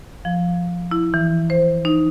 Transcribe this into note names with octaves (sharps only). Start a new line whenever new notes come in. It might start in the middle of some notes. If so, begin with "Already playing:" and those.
F3
E4
E3
C5
D#4